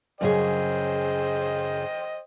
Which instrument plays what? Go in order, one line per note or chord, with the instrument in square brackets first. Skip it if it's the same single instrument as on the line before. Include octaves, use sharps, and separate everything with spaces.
[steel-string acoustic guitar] F#2 C#3 G#4 [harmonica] C5 D#5 G5